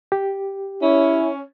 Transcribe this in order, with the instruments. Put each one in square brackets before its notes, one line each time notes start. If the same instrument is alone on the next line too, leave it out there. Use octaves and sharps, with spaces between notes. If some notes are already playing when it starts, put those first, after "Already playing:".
[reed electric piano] G4
[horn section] C#4 [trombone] E4